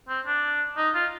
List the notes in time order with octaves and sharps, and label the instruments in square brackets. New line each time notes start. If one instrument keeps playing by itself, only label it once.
[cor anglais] C4
D4
D#4
F4